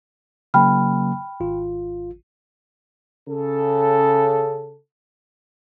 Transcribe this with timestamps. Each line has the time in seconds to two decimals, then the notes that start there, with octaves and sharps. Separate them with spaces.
0.54 C#3 F#3 A#3 G5 B5 F6
1.40 G#1 F4
3.28 C#3 A4